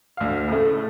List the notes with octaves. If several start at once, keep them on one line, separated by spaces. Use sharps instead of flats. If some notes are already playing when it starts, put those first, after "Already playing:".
D2 F5
A2 C#3 A3